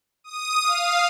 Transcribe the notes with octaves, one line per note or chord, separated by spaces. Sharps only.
D#6
F5